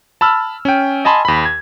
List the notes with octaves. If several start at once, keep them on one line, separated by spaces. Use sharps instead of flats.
A5 B5 E6 F6
C#4 G5
D#5 G#5 A5 B5 C6
D#2 B5
G#6